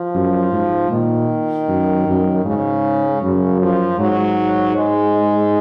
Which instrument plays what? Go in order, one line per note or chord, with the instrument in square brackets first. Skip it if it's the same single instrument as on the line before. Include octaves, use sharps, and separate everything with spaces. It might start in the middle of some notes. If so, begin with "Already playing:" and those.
Already playing: [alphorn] F3
[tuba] F#2
G#2
[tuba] A#2 [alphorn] D#3
[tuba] F#2
F#2
[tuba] G#2 [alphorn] C#3
[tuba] F#2 [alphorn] C#3
[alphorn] F3
[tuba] G#2 [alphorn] F#3
[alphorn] G#3